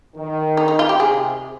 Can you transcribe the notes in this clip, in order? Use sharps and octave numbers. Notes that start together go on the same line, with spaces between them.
D#3
D#4
D#4
F4
G4
C3 G#4